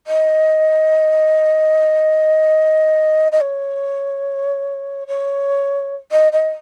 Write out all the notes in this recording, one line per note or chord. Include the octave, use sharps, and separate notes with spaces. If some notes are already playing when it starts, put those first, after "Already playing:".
D#5
D#5
C#5
C#5
D#5
D#5